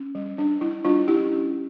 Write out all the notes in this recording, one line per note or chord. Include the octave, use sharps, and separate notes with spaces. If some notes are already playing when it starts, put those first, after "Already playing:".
Already playing: C#4
G3
G3 D4
G3 E4
G3 D4 F4
C#4 E4 G4
C#4